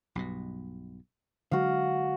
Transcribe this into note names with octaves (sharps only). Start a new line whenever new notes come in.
B1 G2 B2
D3 F#3 G#3 F#4 F5